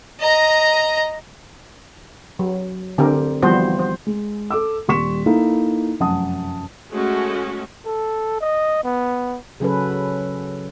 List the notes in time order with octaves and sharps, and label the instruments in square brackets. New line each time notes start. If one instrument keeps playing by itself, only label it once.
[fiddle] D#5 A#5
[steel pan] F#3
D3 C4 G4 A#4
E3 F3 G3 B3 F#4 C5
C5
[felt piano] G#3
A4 D6 E6
D#1 G3 C6 C#6 B6 E7
A#3 D#4 E4 A4 F5
F1 F#2 F#5 A5 D#6
[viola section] G#3 A3 C#4 F#4
[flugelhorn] A4
D#5
B3
[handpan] C#3 F#3 C#4 A4 B4